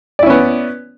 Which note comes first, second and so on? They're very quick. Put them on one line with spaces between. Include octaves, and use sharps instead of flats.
D5 E4 C#4 B3